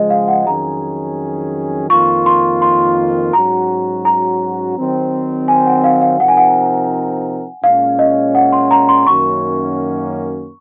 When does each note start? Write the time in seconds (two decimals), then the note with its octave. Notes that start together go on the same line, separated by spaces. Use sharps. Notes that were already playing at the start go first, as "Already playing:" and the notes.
Already playing: C#3 F3 G#3 D#5
0.10 F5
0.28 F#5
0.46 F2 D#3 F#3 C#4 G#4 A#5
1.90 F2 D#3 A#3 F4 C#6
2.26 C6
2.62 C6
3.33 G#2 F#3 C#4 F#4 A#5
4.05 A#5
4.77 D#3 F#3 C4
5.48 G#5
5.66 F#5
5.84 F5
6.02 F5
6.20 C3 F3 C4 D#4 A#4 F#5
6.28 G#5
6.37 F#5
7.64 A#2 G#3 C#4 F5
7.99 D#5
8.35 F#5
8.52 C6
8.71 A#5
8.89 C6
9.07 F#2 D#3 A#3 C#4 F#4 C#6